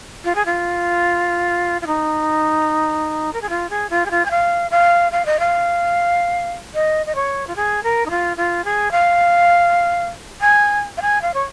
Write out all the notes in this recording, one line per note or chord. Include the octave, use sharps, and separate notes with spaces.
F4
G#4
F4
F4
D#4
A#4
G#4
F4
G#4
F4
G#4
F4
G#5
F5
F5
F5
D#5
F5
D#5
D#5
C#5
F4
G#4
A#4
D#4
F4
F4
G#4
F5
G#5
F5
G#5
F5
C#5